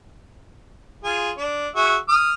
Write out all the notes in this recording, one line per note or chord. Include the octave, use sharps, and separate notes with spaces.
F4 G#4
D4
F#4 G#4 E5
D#6 F6